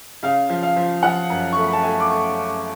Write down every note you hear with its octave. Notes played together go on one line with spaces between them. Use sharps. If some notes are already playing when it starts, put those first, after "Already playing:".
C#3 F5
F3
F5
F3
F3 F#5
F#2
A3 C#6
B5
A5
A3 G#5
D6
A3 C#6